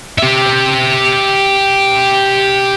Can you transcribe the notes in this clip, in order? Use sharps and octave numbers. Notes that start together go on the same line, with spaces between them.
G4 E5